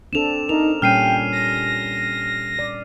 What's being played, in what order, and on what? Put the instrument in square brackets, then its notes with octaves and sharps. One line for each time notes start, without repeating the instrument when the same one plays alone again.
[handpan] C4 D4 A4 [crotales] E7 F7
[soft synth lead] D#4 [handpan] A#4 [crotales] F7
[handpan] A#2 G3 C#4 [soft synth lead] G5 [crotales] F6 C7 D#7
[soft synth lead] A#6
[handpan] D5